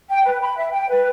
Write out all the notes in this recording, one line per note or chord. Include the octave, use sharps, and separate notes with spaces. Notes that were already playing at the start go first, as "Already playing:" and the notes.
G5
B4
B5
E5
G5
B4